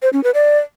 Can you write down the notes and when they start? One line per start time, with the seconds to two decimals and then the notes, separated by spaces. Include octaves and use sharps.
0.02 C5
0.13 C#4
0.24 B4
0.34 D5